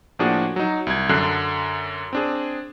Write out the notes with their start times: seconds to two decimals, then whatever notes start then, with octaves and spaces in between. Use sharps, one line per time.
0.19 A2 F3 A#3 D4 F#4 G#4
0.56 F#3 D#4
0.87 C2 G#6
1.09 F#2 D3 A4 F#6 C7
2.13 C4 D4 G#4